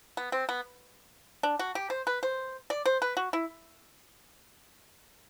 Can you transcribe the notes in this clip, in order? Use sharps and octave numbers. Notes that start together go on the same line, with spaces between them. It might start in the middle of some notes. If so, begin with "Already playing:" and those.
B3
C4
B3
D4
F#4
G4
C5
B4
C5
D5
C5
B4
F#4
E4